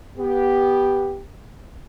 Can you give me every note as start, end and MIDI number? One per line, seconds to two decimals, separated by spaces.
0.18 1.20 59
0.18 1.20 67